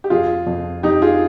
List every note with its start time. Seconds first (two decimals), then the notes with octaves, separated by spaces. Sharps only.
0.04 G4
0.10 F2 F4 G#4
0.47 F2
0.83 F2 D#4 G4
1.02 F4 G#4